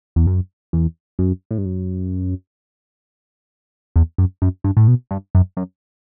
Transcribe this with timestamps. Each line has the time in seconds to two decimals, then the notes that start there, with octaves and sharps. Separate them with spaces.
0.16 E2
0.27 F#2
0.73 E2
1.19 F#2
1.51 A2
1.58 G2
1.65 F#2
3.96 E2
4.18 F#2
4.42 F#2
4.64 G2
4.77 A2
4.88 B2
5.11 G2
5.35 F#2
5.57 F#2